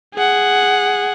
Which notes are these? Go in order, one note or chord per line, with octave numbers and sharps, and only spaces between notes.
G#4 F#5